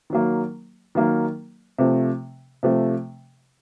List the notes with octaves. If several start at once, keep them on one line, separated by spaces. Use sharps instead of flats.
D#3 F#3 A#3
D#3 F#3 A#3
C3 F3 A3
C3 F3 A3